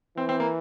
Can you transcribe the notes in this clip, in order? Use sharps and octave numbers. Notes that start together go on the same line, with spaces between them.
E3 C4
C4
A#3